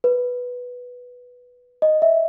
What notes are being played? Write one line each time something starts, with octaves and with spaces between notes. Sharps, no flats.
B4
D#5
E5